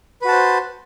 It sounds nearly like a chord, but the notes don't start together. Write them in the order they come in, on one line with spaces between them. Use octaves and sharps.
B4 F#4 A5 C5